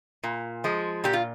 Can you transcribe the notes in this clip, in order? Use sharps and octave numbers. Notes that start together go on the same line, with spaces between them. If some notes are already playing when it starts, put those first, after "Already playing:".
A#2
F3 G#3
A#2 G4
F4